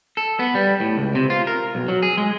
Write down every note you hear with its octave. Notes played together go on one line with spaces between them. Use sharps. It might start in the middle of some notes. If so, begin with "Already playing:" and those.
A4
B3
G3
A2
C#2
C3
F4
A#4
B1
F#3
G#4
G#3